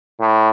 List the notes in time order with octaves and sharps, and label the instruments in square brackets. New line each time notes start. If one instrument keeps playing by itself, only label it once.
[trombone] A2